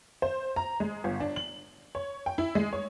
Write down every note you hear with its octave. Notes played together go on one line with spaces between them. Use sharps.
C5
A#5
G#3
G1
D4
F#7
C#5
G5
E4
G#3
C#5